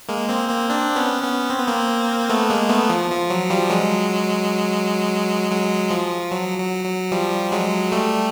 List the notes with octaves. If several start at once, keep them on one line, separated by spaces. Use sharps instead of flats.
G#3 A#3
A#3 C4
A#3 C4
C4 D4
B3 C#4
B3 C#4
C4
B3
A#3 C4
A3 B3
G#3 A#3
A3 B3
F3
F3
F#3
F3 G3
F#3 G#3
F#3 G#3
F3
F#3
F#3
F#3
F3 G3
F#3 G#3
G3 A3